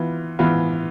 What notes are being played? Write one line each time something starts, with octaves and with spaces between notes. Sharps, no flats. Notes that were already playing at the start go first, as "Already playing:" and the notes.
Already playing: E3 B3 F4
E3 B3 F4